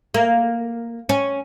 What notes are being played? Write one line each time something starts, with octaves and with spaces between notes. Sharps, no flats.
A#3
C#4